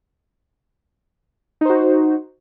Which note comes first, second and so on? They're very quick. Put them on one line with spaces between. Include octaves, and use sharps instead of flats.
D#4 C5 F#4